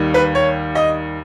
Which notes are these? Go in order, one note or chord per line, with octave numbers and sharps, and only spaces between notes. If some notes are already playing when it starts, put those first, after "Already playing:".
Already playing: D#2 D#3 G3
B4
C#5
D#5